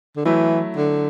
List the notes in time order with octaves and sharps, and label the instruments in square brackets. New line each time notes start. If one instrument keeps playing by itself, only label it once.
[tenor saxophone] D3
[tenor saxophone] E3 [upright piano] F#3 A3 E4
[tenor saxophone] D3